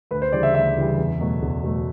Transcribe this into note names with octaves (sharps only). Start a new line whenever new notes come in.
D2 B4
C5
C#3 E3 G3 D5
E5
D2 E5
C#3 E3 G3
E2
B2 F#3 A3
E2
B2 F#3 A3